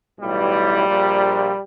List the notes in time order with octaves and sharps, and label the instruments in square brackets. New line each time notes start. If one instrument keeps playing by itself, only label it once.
[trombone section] B1 A2 E3 G3
A#1 A#2